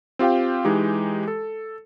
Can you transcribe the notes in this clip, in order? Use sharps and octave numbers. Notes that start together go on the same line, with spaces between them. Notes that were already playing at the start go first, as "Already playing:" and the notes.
C4 F4 G4 F5 G5
E3 G#3 D#4 G4
A4